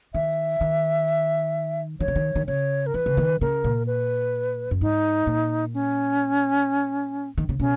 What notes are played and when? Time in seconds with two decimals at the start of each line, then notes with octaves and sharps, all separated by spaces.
0.14 D#3 E5
0.61 D#3
2.00 D#3 C#5
2.08 C#3
2.16 D#3
2.36 D#3
2.47 C#3 C#5
2.86 A#4
2.94 E3 B4
3.06 C#3
3.17 D#3
3.41 C#3 A#4
3.64 A#2
3.87 B4
4.71 F#2
4.81 G#2 D#4
5.27 A#2
5.74 C#4
7.38 D#3
7.49 C#3
7.60 B2 C#4